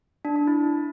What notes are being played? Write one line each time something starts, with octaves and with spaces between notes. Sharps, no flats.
D4
D4
E4